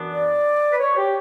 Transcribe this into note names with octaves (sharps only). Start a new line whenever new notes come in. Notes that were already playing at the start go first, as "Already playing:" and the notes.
Already playing: F#2 E3 B3 D4
D5
B4
C#5
G4